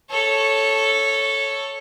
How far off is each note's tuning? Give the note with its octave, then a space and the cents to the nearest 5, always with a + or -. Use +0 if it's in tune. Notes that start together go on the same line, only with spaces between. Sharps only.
A4 +0 C#5 +0